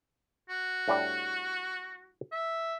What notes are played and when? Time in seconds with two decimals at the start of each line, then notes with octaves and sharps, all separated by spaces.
0.49 F#4
0.88 A2 G3 D4
2.32 E5